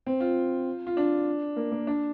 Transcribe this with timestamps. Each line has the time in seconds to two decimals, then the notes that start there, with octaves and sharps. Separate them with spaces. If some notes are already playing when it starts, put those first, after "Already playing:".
0.07 C4
0.20 F4
0.87 F4
0.97 D4
1.56 A#3
1.72 A#3
1.87 D4